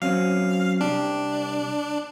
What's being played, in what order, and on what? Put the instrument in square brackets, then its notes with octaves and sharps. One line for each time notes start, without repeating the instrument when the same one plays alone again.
[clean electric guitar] F#3 C4 C#4 [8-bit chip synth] F5
[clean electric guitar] C2 G4 [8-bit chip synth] D4